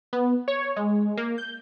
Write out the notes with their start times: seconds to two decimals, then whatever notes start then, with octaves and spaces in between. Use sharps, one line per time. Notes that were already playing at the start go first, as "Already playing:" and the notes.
0.13 B3
0.48 C#5
0.76 G#3
1.17 A#3
1.38 G6